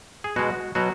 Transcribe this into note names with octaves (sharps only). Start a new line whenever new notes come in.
G#4
B2 G#3 F#4
B2 F#3 F#4